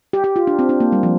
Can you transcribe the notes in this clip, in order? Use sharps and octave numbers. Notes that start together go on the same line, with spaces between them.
G4
G4
F4
D4
C4
D4
A#3
G3
F3